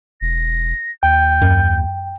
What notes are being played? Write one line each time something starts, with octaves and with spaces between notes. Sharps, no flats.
E1 A#6
D#2 G5 G6
F#2